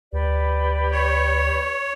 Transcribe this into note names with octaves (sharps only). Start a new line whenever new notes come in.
D2 G4 B4 D5
C#5